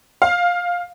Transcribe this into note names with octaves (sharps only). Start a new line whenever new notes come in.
F5